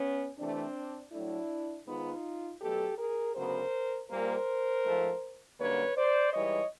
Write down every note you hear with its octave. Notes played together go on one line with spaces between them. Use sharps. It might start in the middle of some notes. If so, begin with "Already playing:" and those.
Already playing: B3 C#4
C3 E3 A3 C4 D4
A2 F#3 A3 D4 E4
G#2 D#3 G#3 B3 D#4 F4
B2 F#3 A3 G4 A4
G#4 A#4
D2 C#3 F#3 B3 A#4 C5
A#2 G3 A#3 A#4 C5
G#2 F3 A3
F#2 D3 G3 A#3 B4 C#5
C5 D5
G#2 E3 G3 C#5 D#5